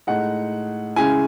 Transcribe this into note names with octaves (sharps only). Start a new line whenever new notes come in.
A2 G#3 D#4 F#5
C#3 G#3 C#4 E4 G#5